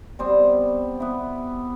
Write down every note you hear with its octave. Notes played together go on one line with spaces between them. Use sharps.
G3 B3 C4
B3 E4